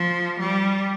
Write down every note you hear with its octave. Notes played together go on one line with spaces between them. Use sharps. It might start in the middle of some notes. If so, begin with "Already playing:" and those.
Already playing: F3
G3